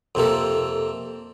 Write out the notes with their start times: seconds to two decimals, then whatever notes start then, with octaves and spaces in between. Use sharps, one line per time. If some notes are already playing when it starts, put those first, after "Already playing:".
0.15 F2 C3 A#3 A4